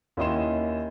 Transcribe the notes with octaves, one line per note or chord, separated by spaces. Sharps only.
D#2 C#4 E4 D#5 C6 E7